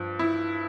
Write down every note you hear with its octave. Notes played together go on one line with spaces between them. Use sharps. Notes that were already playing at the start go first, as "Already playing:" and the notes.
Already playing: G2 F3
E4